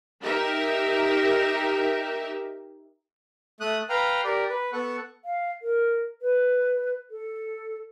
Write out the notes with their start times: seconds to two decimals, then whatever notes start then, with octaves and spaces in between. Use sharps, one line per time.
0.23 D#4 G4 A#4 E5
3.61 A3 D#6 F#6
3.90 B4 F5 G5 A#5 F6
4.24 G4 A#4 D5
4.49 B4
4.73 B3 A4 F#5 C#6
5.25 F5
5.62 A#4
6.22 B4
7.11 A4